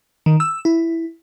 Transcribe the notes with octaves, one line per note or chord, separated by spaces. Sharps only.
D#3
E6
E4